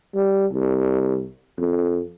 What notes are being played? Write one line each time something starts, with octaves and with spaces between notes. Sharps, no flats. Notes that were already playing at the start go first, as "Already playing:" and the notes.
G3
C2
F2